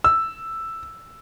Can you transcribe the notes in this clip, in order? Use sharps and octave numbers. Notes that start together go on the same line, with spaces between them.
E6